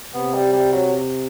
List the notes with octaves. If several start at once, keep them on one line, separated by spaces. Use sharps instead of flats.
C3 B3
G3
G3
F#3